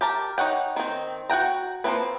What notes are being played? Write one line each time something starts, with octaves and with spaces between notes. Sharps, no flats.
G4 A#4 A5
D#4 C#5 F#5 G5
D#3 C4
F#4 F#5 G5 A#5
F3 A3 A#3 C4 B4